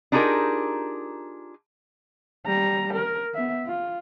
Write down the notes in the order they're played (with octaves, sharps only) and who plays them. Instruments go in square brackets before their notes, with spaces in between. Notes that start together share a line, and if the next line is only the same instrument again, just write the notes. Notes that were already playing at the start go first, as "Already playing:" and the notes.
[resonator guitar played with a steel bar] D4 D#4 F4 G4 G#4 A#4
[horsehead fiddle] G3 A#5
A#4
B3 E5
F4